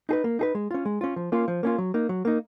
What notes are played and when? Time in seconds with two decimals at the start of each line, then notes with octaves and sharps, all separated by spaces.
0.09 D#4 G#4 B4
0.24 A#3
0.39 D#4 G#4 B4
0.55 G#3
0.71 C#4 F4
0.85 G#3
1.01 C#4 F4
1.16 F3
1.32 A#3 C#4 F4
1.48 F3
1.63 A#3 C#4 F4
1.78 F#3
1.94 A#3 D#4
2.09 F#3
2.25 A#3 D#4